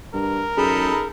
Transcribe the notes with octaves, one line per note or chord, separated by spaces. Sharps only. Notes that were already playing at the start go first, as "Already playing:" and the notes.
G2 A#4
F#2 D#4 G#4 A4 B5